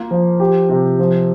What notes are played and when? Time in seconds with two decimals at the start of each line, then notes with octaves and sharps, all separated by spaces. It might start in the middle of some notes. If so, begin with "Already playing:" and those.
Already playing: A#3 F4
0.11 F3
0.40 G4
0.69 C3
0.99 F3